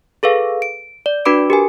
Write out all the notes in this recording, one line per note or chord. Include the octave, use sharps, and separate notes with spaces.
G#4 A4 B4 F5
D7
D5
D4 F#4 B4 B5 D6 D7
G4 A#4 G#5